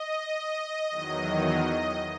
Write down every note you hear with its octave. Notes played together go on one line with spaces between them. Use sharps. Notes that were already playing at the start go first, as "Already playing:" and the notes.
Already playing: D#5
E2 D#3 F#3